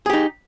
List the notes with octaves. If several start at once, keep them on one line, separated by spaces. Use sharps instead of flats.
D#4 G4 G#4